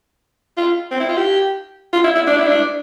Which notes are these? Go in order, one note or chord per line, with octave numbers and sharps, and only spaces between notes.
F4
C4
E4
F4
G4
F4
E4
E4
D4
E4
D4